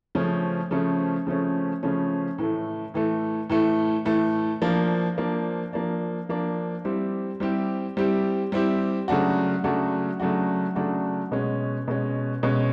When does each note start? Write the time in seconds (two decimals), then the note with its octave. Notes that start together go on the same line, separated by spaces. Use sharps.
0.15 C#3 F3 A3 C#4
0.71 C#3 F3 A3 C#4
1.27 C#3 F3 A3 C#4
1.83 C#3 F3 A3 C#4
2.38 A2 E3 A3
2.94 A2 E3 A3
3.50 A2 E3 A3
4.05 A2 E3 A3
4.62 F3 A#3 D4
5.18 F3 A#3 D4
5.73 F3 A#3 D4
6.29 F3 A#3 D4
6.85 G3 C4 E4 G4
7.40 G3 C4 E4 G4
7.97 G3 C4 E4 G4
8.52 G3 C4 E4 G4
9.08 C#3 F#3 A3 D4 F#4
9.64 C#3 F#3 A3 D4 F#4
10.20 C#3 F#3 A3 D4 F#4
10.75 C#3 F#3 A3 D4 F#4
11.32 B2 G#3 C#4
11.88 B2 G#3 C#4
12.43 B2 G#3 C#4